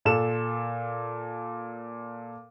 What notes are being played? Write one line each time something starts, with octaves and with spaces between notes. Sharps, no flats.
A#2 A4 E7